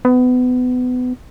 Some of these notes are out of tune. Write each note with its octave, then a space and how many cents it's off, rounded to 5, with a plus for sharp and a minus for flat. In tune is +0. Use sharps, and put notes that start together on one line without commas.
B3 +25